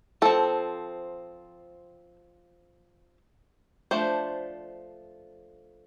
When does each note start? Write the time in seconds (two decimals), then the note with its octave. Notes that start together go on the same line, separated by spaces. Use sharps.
0.22 F3 C4 A4
3.91 F3 A3 D4 C5